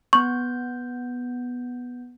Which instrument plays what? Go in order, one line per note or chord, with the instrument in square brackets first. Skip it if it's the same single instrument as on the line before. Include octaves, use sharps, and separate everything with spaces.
[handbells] B3 G6 [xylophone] C#6